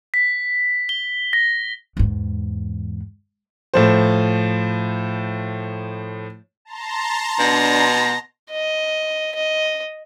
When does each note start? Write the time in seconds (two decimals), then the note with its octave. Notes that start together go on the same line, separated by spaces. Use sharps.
0.14 B6
0.89 G7
1.33 A#6
1.97 E2 G#2
3.74 A2 F3 C5
6.65 A5 A#5 C6
7.40 B2 D4 A#6
8.50 D#5
9.35 D#5